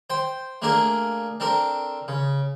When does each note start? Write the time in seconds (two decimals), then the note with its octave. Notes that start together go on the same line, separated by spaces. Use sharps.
0.10 C5 G5
0.62 A3 A#3 D4 G#4 A#4 F5
1.40 C4 D4 A4 A#4
2.08 C#3